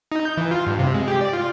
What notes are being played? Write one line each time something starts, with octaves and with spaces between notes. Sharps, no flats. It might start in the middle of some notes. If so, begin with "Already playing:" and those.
D#4
G6
E3
F4
G2
C3
G#3
G4
D5
F4